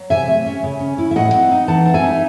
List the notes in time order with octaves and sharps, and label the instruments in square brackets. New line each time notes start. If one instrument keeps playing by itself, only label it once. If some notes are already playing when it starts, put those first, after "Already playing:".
Already playing: [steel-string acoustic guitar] F#3
C3 E5 G#5
A3
C#4
C#3
C#4
E4
E5
A2 D#5 F#5
C4
D#4
E3 F#5 A5
C4
E5 G#5
D#4